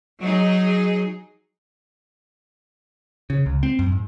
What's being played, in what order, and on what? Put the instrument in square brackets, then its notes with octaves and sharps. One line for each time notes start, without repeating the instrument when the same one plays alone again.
[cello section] F#3 D#4 G#4
[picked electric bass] C#3
C#2
C4
F#2
G#2